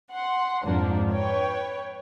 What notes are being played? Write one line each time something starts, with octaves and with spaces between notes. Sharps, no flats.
F#5 C6
F2 G#2 F3 A#3 D4
B4 C#5 G5